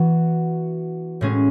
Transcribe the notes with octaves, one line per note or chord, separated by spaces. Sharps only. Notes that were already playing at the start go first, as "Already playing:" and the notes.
Already playing: E3 B3 F#4
A2 G#3 C#4